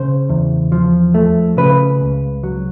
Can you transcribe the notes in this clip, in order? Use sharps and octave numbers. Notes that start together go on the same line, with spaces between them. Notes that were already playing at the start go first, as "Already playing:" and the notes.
Already playing: C#3 C5
E2
F3
A3
C#3 B4
C#2
F#3